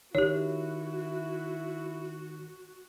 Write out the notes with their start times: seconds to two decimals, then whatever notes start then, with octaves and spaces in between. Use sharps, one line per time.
0.15 D#3 E4 F#4 G4 C#5